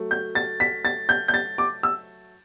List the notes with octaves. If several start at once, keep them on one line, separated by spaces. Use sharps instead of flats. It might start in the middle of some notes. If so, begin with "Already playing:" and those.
Already playing: F#3 A3
G6
A6
B6
A6
G6
G6
A6
D6
E6